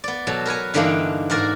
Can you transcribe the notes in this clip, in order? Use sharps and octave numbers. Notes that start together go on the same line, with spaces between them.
B3 D5
B2 F#3 A4
A#4 B4 C#5 G#5
G2 D3 E3 A#3 D4 D#4
G#2 F#4 A#4 D5 G#5